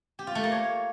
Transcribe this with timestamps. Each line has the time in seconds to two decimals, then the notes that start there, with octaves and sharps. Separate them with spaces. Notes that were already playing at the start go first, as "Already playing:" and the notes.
0.19 G4
0.27 F4
0.35 A3
0.44 A#3
0.52 C#5